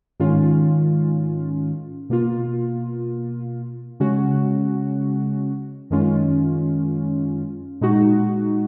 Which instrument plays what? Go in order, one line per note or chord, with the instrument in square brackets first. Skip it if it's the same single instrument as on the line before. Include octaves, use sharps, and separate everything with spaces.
[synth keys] G#2 D#3 G#3 C#4 F4
B2 A#3 F4
C#3 G#3 C#4 F#4
F#2 D#3 G#3 C#4 F4
A#2 G#3 D#4 F#4